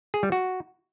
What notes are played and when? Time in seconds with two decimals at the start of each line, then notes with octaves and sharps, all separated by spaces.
0.14 G#4
0.23 G3
0.32 F#4